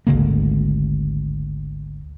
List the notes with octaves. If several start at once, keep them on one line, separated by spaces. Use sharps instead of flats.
G#1 D2 C#3 A#3